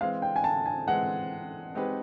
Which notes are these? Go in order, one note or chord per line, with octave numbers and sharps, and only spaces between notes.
E3 G#3 C4 F5
G5
G#5
A5
G#5
E3 G#3 C4 F#5
G#3 C4 D#4 G4 B4